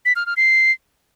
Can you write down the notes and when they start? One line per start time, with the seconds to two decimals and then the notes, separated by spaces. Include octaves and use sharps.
0.05 B6
0.16 F6
0.26 F6
0.37 C7